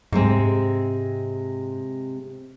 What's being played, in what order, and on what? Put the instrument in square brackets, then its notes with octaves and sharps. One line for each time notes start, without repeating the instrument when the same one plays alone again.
[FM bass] G#2 [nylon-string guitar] C3 G#3 C4